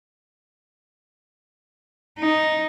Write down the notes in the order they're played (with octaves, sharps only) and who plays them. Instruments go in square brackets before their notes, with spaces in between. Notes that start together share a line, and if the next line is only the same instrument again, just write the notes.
[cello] D#4